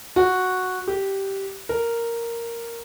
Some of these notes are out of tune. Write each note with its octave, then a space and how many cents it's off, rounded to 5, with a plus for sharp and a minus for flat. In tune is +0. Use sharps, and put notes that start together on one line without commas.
F#4 -5
G4 -10
A#4 -5